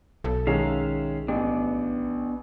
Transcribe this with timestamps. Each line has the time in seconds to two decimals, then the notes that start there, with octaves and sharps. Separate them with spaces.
0.24 B1 A4
0.47 D#3 G#3 C#4 E5 F5 A#5
1.28 A1 B3 D4